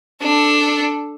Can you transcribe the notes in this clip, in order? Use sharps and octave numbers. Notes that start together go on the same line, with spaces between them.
D4 A4